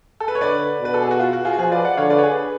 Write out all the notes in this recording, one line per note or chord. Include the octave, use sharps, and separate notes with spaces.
A4
B4
C#5
D3 B4 D5
B2
B4
A4
G#4
F#4
F4
F#4
F4 G#4
F#4
F3 F4 G#4
B4 D5
D5 F#5
D3 C#5 F5
B4 D5
C#5
G#4 B4